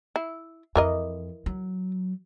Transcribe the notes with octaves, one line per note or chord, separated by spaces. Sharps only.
E4
F2 E3 A#4 D#5
F#3